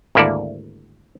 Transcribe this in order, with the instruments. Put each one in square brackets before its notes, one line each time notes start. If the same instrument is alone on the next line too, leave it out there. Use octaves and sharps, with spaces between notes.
[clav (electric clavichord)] G#1 D2 A#3 E4 A4 D5